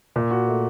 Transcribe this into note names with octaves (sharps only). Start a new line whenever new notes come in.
A#2
F#4
A3